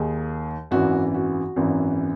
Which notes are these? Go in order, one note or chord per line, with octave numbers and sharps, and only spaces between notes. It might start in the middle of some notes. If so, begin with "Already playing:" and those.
Already playing: D#2 D#3 G#4
G#1 F#2 E3 F#4
F#4
G#1 F#2 E3